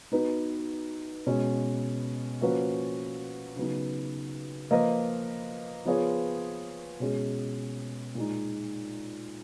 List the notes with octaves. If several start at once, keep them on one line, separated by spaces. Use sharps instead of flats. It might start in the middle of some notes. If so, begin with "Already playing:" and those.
B3 D#4 F#4 B4
B2 G#3 C#4
F3 A#3 C#4 F#4 B4
C#3 F#3 B3 D#4
F3 A#3 F4 B4 D#5
F3 B3 F4 G#4 C#5
B2 G#3 C#4 G#4
A#2 G#3 D#4